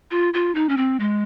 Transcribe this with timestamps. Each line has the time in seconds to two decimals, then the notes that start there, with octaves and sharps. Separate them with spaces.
0.11 F4
0.34 F4
0.55 D#4
0.69 C#4
0.77 C4
1.00 G#3